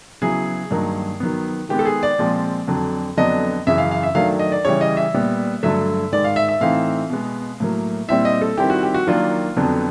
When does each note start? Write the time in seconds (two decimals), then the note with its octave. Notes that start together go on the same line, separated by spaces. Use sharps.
0.22 C#3 F#3 B3 E4 G#4
0.71 G2 D#3 F#3 A#3 D#4
1.20 D#3 F#3 B3
1.69 D#3 G#3 B3 G4
1.79 A4
1.85 G#4
2.03 D5
2.19 A#2 F3 G#3 C4
2.67 F2 D3 F#3
3.17 F2 D3 F#3 B3 D4 D#5
3.67 F#2 C#3 E3 E5
3.78 F5
3.91 F5
4.03 E5
4.15 D#3 F#3 A3 D4 F5
4.39 D#5
4.52 D5
4.65 C#3 E3 G3 C#5
4.81 D#5
4.97 E5
5.14 A#2 G3 B3
5.63 G2 D3 F#3 A3 E5
6.12 G#2 D#3 G#3 D5
6.24 F5
6.36 E5
6.48 E5
6.61 A2 E3 A3 C4 D#4 F5
7.10 B2 G#3 B3
7.60 A2 F#3 A#3
8.08 A#2 G3 C4 E4 E5
8.25 D#5
8.41 A4
8.58 D#3 G3 C4 E4 G4
8.70 F#4
8.83 G4
8.94 F#4
9.07 D#3 F#3 A#3 D4 F4
9.56 F2 D3 F#3 B3